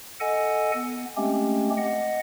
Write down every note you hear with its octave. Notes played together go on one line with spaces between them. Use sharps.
A4 D#5 F#5 G#5
B3
G#3 A3 C4 C#4 G4
D#5 F#5